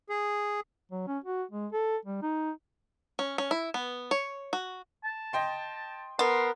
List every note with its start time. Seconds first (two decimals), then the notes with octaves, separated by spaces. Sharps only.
0.10 G#4
0.91 F#3
1.07 C#4
1.24 F#4
1.51 G#3
1.72 A4
2.05 G3
2.22 D#4
3.19 C#4
3.38 C#4
3.51 E4
3.74 B3
4.11 C#5
4.53 F#4
5.04 A5
5.33 D#5 G5 C6
6.19 B3 A#4 C6